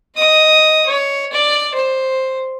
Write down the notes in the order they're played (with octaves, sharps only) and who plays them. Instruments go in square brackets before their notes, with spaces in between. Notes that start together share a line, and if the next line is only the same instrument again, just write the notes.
[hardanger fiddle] D#5 D#6
C#5
D5
C5